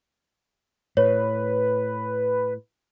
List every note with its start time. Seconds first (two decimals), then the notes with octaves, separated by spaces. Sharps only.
0.97 A2 B4 C#5